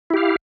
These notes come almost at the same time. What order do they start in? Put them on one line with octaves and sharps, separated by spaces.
E4 G4 F5